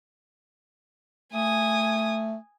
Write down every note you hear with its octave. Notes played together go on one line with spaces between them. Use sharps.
A3 G#5 D#6